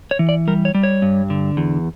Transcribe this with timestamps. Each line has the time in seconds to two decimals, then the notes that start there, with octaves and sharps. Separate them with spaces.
0.11 C#5
0.19 E3
0.29 D5
0.48 G3 A#4
0.65 C#5
0.74 G3
0.83 C#5
1.02 G2
1.30 D3
1.57 E2